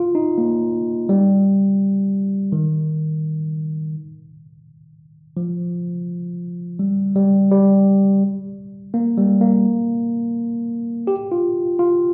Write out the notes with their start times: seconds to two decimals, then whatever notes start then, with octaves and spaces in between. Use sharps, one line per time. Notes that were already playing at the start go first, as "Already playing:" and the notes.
Already playing: F4
0.15 D#4
0.38 A#3
1.09 G3
2.52 D#3
5.37 F3
6.79 G3
7.15 G3
7.51 G3
8.94 A#3
9.17 G3
9.41 A#3
11.07 G4
11.32 F4
11.79 F4